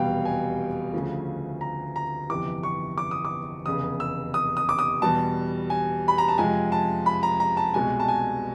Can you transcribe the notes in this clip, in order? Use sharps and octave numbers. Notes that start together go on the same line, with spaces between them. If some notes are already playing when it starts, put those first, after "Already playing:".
Already playing: F1 E2 B2 G3 F5 G5
G#5
D2 C#3 F3 A3
A#5
A#5
G1 F2 C3 E3 D6
C#6
D6
D#6
D6
F1 E2 C#3 D#6
E6
D#6
D#6
D6
D#6
E2 B2 G3 A5
G#5
B5
A#5
A5
F2 C3 F3 G#3 G#5
A5
B5
A#5
A#5
A5
C2 B2 G#3 G#5
A5
G#5